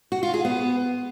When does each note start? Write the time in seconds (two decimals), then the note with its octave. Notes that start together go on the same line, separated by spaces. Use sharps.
0.12 F#4
0.23 F4
0.34 G#4
0.45 B3